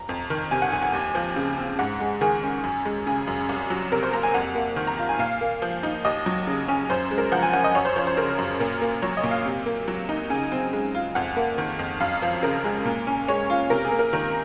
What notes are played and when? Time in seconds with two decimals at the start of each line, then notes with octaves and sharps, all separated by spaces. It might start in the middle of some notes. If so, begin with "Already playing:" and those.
Already playing: A#5
0.09 F2
0.30 D#3
0.51 C3 G#5
0.62 F#5
0.72 F2 G#5
0.83 G#5
0.93 D#2
1.15 F3
1.36 C#3
1.57 C4
1.79 G#2 F#5
2.00 G#3
2.21 D#3 G#4
2.43 C#4
2.64 F#2
2.85 G#3
3.07 C#3 G#4
3.27 F#2
3.49 C2
3.70 F#3
3.92 C3 A#4
4.03 C5
4.13 A#3 A#5
4.23 G#5
4.34 F2 F#5
4.55 A#3
4.76 D#3
4.87 A#5
4.98 F4
5.09 G#5
5.19 A#2 F5
5.41 A#3
5.62 F3
5.83 D#4
6.05 D#2 D#5
6.26 F#3
6.47 C#3
6.68 C#4
6.89 F#2 C5
7.11 G#3
7.18 A#4
7.32 F3 F#5
7.43 G#5
7.53 C#4 F#5
7.64 D#5
7.75 F#2 C#5
7.85 C5
7.96 F3 C#5
8.07 C5
8.17 C#3 A#4
8.38 F#2
8.60 A#2 A#4
8.81 A#3
9.02 F#3 C#5
9.17 D#5
9.24 A#2
9.31 F5
9.46 C3
9.66 A#3
9.88 F#3
10.09 D#4
10.30 C#3 G#5
10.52 C4
10.73 G#3
10.94 F4
11.15 F2 F#5
11.37 A#3
11.58 D#3
11.79 F2
12.00 F#2 F5
12.22 F3
12.43 C#3 A#4
12.64 G#3
12.85 A#2
13.07 C#4
13.28 G#3 C#5
13.50 F4
13.70 C3 A#4
13.85 G#4
13.92 A#3
13.99 A#4
14.13 D#3 A#4